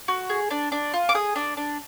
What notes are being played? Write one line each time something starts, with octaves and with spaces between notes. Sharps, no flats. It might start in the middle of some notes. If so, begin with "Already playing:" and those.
F#4
G#4
D4
D4
F4
D6
G#4 D#6
D4
D4